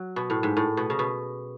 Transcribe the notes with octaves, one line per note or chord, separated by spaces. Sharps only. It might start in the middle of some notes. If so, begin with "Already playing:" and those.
Already playing: F#3
B2
A2
G#2
A2
B2
C#3
B2